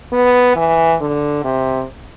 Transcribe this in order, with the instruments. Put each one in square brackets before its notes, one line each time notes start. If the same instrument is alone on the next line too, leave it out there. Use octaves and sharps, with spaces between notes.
[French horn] B3
E3
D3
C3